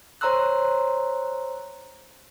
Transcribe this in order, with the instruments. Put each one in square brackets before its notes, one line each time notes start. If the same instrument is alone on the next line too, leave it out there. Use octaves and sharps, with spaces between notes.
[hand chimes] C5 C#5 A#5 C6 E6 F#6